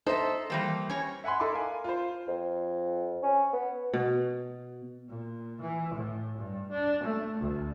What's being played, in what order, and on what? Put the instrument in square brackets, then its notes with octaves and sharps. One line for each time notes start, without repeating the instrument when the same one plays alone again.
[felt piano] D#4 C5 [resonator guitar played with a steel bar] A4 E5
[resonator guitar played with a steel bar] E3 G3 A#3
C#4 C#5
[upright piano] E5 F#5 G#5 B5 C6
D#4 E4 A4 E5 C6 D6
A#4 F5 G#5
F4 C5
[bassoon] F2
C#4
B3
[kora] B2
[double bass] A#2
E3
A2
G2
D4
A3
D2